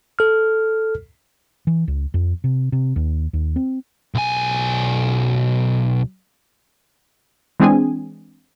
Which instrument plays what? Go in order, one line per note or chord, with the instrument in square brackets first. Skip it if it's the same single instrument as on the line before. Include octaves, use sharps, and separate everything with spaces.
[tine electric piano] A4 F6
[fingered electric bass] E3
C#2
F2
C3
C3
D#2
D#2
C4
[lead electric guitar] B1 G#5
[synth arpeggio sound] E3 G#3 C4 D4 G#4 G#5